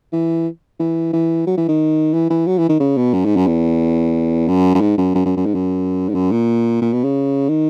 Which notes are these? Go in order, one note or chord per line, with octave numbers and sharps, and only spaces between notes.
E3
E3
E3
F#3
E3
D#3
E3
E3
F#3
E3
D#3
C#3
B2
F#2
G#2
F#2
E2
F#2
F#2
G#2
F#2
F#2
F#2
F#2
G#2
F#2
G#2
F#2
A#2
A#2
B2
C#3
D#3